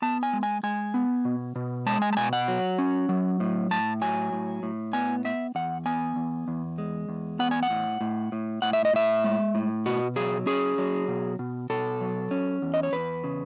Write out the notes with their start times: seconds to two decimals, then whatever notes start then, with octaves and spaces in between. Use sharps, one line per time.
0.02 B3 A5
0.23 G#5
0.33 G#3
0.43 G#5
0.63 G#3 G#5
0.94 B3
1.25 B2
1.56 B2
1.86 G#3 A5
2.02 G#5
2.13 A5
2.17 B2 G#5
2.33 F#5
2.48 F#3
2.78 C#4
3.09 F#3
3.40 A2
3.71 A2 A5
4.02 F#3 G#5
4.33 A2
4.63 A2
4.93 B3 G#5
5.25 B3 E5
5.55 E2 F#5
5.86 B3 G#5
6.16 E2
6.48 E2
6.78 G#3
7.09 E2
7.39 B3 F#5
7.51 G#5
7.63 F#5
7.70 A2
8.01 A2
8.32 A2
8.62 A2 F#5
8.73 E5
8.85 D#5
8.93 A2 E5
9.24 G#3
9.55 A2
9.86 B2 F#4
10.16 F#3 G#4
10.46 C#4 G#4
10.78 F#3
11.08 B2
11.39 B2
11.70 B2 A4
12.01 F#3
12.31 C#4
12.62 E2
12.74 D#5
12.83 C#5
12.92 E2 B4
13.24 C#3